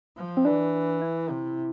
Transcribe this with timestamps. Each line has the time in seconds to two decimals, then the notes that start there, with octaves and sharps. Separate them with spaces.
0.17 F3
0.37 C4
0.45 E3 D4
1.02 E4
1.30 C3